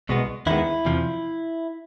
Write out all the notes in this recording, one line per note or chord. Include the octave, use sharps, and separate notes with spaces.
C2 B2 G#3 B3
D#2 D#3 G#3 B3 E4
E2 C3 F3